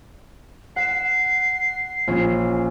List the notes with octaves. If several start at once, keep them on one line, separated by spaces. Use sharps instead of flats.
F#5 B6 C7 E7
A#1 C#4